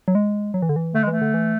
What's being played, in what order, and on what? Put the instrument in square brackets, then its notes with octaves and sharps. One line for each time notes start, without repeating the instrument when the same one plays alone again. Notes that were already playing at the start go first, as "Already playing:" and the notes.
[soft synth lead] F#3
G#3
F#3
E3
D3
E3
[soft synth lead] D3 [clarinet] A3
[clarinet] G#3
[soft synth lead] E3 [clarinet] A3
[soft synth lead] D3
E3